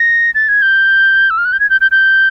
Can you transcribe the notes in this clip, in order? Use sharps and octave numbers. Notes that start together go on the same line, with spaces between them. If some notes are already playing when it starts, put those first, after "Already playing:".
Already playing: A#6
A6
G#6
G6
E6
F6
F#6
G6
G#6
G6
G6
G6